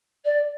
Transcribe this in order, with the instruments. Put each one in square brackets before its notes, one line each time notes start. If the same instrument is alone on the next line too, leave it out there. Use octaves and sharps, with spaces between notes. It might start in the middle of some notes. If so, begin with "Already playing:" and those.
[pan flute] D5